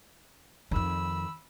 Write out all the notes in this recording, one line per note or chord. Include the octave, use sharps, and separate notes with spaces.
F2 D#3 B5 E6